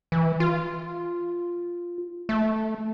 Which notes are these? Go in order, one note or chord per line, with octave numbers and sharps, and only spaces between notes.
E3
F4
A3